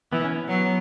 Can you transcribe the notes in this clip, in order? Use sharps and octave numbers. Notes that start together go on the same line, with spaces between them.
E3 B3
C#4
B3
F#3